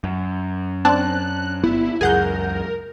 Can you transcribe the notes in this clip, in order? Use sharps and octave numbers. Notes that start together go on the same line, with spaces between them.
F#2
C4 D4 A5 F#6
G1 B3 E4
C#2 F#2 G#4 A#4 F#5 G6